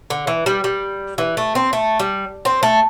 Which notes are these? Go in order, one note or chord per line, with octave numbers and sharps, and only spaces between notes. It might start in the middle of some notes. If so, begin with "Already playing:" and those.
D3
E3
G3
G3
E3
A3
C4
A3
G3
C4
A3